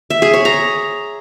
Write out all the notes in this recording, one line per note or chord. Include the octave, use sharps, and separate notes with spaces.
E5
G#4
C#5
A#5